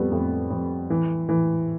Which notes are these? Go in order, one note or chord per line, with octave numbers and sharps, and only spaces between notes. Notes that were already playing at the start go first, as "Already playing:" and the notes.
Already playing: F2 G3 A3 B3
F2 A3
F2
E3
E3